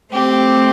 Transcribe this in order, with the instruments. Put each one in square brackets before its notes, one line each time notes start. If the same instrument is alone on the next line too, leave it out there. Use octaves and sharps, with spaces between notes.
[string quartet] A3 C4 [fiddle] G4